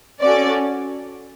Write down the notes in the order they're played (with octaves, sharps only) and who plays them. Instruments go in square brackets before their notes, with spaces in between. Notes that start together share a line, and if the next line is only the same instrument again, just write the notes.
[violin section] C#4 F#4 A4 D5